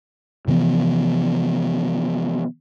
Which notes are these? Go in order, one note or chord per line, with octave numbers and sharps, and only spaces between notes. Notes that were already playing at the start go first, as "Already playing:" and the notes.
C3 E3 F3 B3